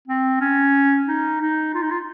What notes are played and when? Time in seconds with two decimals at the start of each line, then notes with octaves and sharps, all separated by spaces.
0.08 C4
0.41 C#4
1.07 D#4
1.40 D#4
1.74 F4
1.82 D#4
1.91 F4